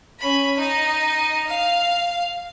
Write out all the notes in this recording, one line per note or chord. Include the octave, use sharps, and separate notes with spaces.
C#4 B5
D#4 D#5
F5